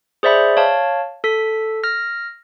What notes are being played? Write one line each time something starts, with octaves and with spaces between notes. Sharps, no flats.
G#4 C5 D5 E5 B5
C#5 F5 A5
A4 B6
F6 A#6